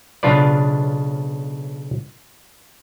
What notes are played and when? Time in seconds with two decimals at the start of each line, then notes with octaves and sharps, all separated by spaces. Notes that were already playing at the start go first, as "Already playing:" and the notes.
0.23 B1 C#3 D4 F4 B4 D5